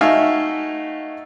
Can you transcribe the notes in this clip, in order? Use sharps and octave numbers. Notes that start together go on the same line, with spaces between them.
A3 D#4 F#4 E5 F5 G#5